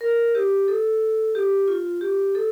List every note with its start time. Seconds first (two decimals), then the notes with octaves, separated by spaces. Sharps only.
0.01 A#4
0.35 G4
0.68 A4
1.35 G4
1.68 F4
2.01 G4
2.35 A4